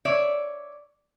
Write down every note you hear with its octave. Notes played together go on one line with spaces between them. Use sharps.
C#5 D5 E5